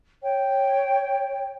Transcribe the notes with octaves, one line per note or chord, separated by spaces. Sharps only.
C#5 G5